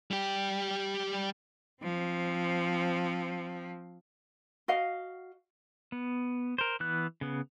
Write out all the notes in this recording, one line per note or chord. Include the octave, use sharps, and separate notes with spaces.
G3 G4
F3 C4
F#4 D#5 F5
B3
A#4 C5
E3 B3 F#6
C#3 B3